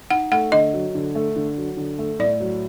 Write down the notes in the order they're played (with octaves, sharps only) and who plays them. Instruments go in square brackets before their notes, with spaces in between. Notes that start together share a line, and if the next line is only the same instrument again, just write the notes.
[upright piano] D#4 [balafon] F#5
[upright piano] A3 [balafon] F#5
[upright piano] D3 [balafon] D#5
[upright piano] F#3
D3
A3
D3
F#3
D3
A3
[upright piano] A2 [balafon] D5
[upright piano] F#3